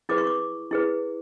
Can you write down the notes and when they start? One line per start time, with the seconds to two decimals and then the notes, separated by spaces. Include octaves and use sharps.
0.09 E4 G#4 B4 D6
0.18 C#6
0.27 D6
0.71 E4 G#4 B4